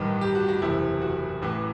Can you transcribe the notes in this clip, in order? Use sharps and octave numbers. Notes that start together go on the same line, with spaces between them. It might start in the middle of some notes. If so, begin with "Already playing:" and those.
Already playing: A1 G2 D#3 B4
G4
F#4
F#4
F#1 E2 C3 E4
F#4
A1 A2 E3